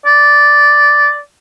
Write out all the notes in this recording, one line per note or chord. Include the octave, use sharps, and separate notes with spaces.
D5